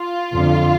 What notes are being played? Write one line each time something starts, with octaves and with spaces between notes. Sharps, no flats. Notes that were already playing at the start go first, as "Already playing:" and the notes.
Already playing: F4
F2 D3 F3